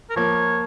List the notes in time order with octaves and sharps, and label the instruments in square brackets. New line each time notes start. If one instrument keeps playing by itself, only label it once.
[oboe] A#4
[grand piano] F3 A#3 [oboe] C#5